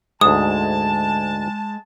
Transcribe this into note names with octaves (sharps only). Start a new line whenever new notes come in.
D2 G#2 G#3 A5 D#6